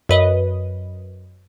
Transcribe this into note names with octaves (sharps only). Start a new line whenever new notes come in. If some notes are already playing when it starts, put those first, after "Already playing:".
F#2 B4 D#5